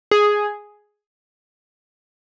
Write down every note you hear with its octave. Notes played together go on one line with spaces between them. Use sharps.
G#4